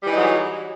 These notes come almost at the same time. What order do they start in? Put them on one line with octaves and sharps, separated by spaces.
G3 E3 D#4 F#3 G#4